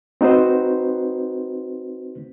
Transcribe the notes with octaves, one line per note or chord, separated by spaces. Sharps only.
C4 D#4 F#4 B4 C5